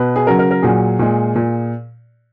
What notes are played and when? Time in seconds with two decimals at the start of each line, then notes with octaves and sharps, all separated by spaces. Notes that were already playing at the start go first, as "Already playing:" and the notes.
Already playing: B2 B4
0.16 G#4
0.27 C#3 F#3 A#4
0.39 A#4
0.51 A#4
0.62 A#2 F#3 G#4
0.99 A#2 G#3
1.36 A#2